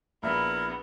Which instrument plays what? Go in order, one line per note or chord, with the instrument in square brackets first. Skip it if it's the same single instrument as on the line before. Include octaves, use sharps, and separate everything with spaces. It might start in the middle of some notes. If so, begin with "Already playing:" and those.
[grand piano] A#1 E5 [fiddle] B3 [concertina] E4 A#4